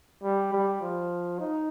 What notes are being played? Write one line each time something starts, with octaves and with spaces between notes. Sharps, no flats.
G3
G3
F3
D#4